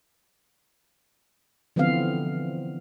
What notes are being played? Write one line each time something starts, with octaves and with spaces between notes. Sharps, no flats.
D3 E3 F3 B3 C4 F5